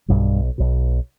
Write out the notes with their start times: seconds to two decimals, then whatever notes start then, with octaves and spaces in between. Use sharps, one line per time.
0.08 B1 G2 B2 G3
0.58 B1 B2